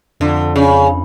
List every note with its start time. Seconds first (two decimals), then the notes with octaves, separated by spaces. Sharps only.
0.20 F2 D3
0.56 C#3